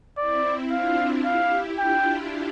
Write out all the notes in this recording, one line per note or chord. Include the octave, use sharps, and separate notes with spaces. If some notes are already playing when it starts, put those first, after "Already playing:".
C4 E4 D5
D4 F4 F5
E4 G4 F5
D4 F4 G5